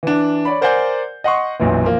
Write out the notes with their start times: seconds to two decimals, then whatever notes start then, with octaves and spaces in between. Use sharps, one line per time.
0.03 E3 D4
0.45 C#5 D5 B5
0.61 A#4 C5 D5 F#5 G#5 G6
1.24 D#5 F#5 C6 C#6
1.59 B1 F#2 A#2 E3
1.84 F3 A#3